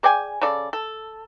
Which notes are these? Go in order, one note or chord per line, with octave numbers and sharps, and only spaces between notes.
G#4 D5 G5 G#5
C#3 A4 D5
A4